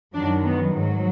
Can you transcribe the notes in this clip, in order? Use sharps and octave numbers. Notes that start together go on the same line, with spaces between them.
F#2 D#3 F#3 D4
B3
G#2 F#3